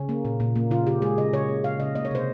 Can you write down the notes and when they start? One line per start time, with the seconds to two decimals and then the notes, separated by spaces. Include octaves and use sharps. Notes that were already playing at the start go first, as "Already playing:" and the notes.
Already playing: C#3 C#4
0.09 A#3
0.25 A#2
0.40 A#2
0.56 A#3
0.71 C#3 F4
0.87 C#3 G4
1.02 G#3 G#4
1.18 C#3 D#5
1.33 C#3 C#5
1.49 A#3
1.64 C#3 F5
1.80 C#3 D#5
1.95 A#3 D#5
2.05 C#5
2.11 C3 C5